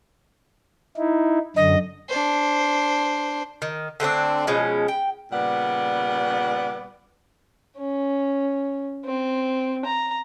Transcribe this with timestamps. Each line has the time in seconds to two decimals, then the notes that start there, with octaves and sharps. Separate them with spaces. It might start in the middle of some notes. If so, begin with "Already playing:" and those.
0.97 D#4 E4
1.56 F#2 D3 D#5
2.09 D4 C5
3.62 D#3
4.00 D3 A3 C4 D4
4.47 B2 F3 G#3 C#4
4.88 G5
5.32 A#2 C#3 G3 B3 D5 F#5
7.78 C#4
9.05 C4
9.85 A#5